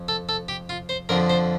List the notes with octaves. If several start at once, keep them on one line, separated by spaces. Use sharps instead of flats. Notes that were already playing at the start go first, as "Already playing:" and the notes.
Already playing: F2
A4
A4
G4
F4
C5
F2 D3 F3 A#4
C5